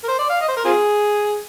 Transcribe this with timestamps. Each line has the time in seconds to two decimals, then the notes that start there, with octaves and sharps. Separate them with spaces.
0.03 A#4
0.08 C5
0.18 D5
0.30 F5
0.41 D#5
0.48 C5
0.57 A#4
0.65 C4 F4 G#4